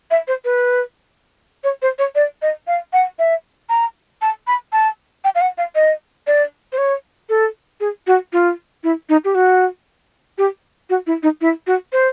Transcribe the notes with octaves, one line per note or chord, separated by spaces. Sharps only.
E5
C5
B4
C#5
C5
C#5
D5
D#5
F5
F#5
E5
A#5
A5
B5
A5
G5
F5
F#5
F5
D#5
D5
C5
C#5
A4
G#4
F#4
F4
E4
D#4
G4
F#4
G4
F#4
E4
D#4
E4
F#4
C5